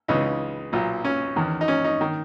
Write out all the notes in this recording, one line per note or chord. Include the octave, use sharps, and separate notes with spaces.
C#2 C#3 E3 D#4
B1 A#2
C#4
E2 D#3
D#4
C#4
D#4
D#3